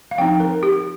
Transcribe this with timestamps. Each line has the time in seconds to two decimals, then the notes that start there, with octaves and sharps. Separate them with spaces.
0.11 F5
0.18 F3 C4 D#4 G5
0.40 A#4
0.63 G4